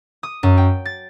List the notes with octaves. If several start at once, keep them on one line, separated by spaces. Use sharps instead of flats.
D#6
F#2
G5
A6